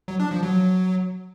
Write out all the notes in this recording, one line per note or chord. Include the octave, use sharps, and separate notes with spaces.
F#3
D4
F3
F#3